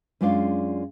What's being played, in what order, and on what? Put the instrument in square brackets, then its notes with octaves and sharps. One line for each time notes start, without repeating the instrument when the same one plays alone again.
[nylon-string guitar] F#2 G#3 D4 F4 D5 F5